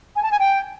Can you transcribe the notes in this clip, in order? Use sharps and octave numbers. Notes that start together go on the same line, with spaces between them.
G#5
A5
G#5
G5